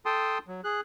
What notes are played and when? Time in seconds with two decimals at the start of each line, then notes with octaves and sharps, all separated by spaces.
0.06 A4 G5 A5 C6 D#6
0.48 F#3
0.64 G#4 F#6